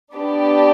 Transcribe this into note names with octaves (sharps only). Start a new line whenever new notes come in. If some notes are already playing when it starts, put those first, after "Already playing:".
B3 D4 G4 D5 A5